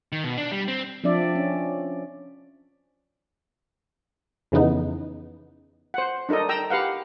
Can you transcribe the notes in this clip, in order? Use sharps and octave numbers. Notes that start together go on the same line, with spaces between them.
D#3
B2
D4
G3
C4
F3 C4 D4 D5 E5
C#4
F2 C#3 E3 B3 D#4
C5 F#5
D4 D#4 A4 A#4 D#5
G5 A#5 E6
G4 B4 F5 F#5